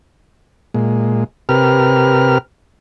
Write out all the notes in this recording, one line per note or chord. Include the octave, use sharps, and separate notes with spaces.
A#2 G#3
C3 G4 A#4 B4 F6